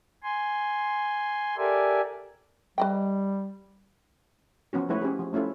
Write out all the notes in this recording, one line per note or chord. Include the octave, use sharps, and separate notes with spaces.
G#5 C6
G4 A4 A#4 D5 E5 G#5
G3 B4 D#5 G5
F3 B3 C#4 F#4
F3 G#3 A3 E4 B4 C#5
C#4 G4 G#4
F3
A3 C#4 E4 F4 A4